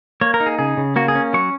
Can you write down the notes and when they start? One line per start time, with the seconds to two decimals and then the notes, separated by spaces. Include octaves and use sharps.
0.21 A#3 C#5
0.34 A#4
0.40 D#4
0.46 G#4
0.59 C#3 G#4
0.77 C#3
0.96 A#3 F#4
1.08 G#4
1.15 C#4
1.33 F#3 C#6